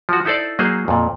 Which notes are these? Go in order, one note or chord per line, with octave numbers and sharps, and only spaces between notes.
F3 F#4
D#4 E4 A4 C5 D5
F#3 A#3 D#4 G#4 C5
F2 A#2